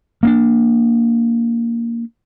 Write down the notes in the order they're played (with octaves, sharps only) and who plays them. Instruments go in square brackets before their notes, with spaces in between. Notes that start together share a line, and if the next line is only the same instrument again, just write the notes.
[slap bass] A#3 C4 D4